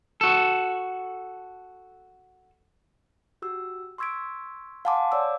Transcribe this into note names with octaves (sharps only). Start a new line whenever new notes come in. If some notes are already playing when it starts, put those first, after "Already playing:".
F#4 A4
F#4 G4 E6
C6 C#6 E6 G#6 B6 D7
F5 F#5 G#5 A5 C6 D6
C#5 D5 F5 D6 E6